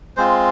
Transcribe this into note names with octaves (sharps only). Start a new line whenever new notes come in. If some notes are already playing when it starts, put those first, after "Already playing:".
G#3 C4 F4 C5